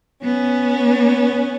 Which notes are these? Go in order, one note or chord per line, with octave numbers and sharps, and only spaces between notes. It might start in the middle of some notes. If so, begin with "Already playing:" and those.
B3 C#4